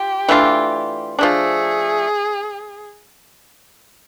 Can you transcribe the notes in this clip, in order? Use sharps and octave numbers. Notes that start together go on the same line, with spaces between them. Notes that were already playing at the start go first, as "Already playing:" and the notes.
Already playing: F4 G4
E3 A3 D4 F4
F3 A3 D4 G#4